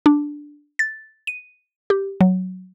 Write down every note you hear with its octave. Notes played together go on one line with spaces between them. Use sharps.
D4
A6
D#7
G4
F#3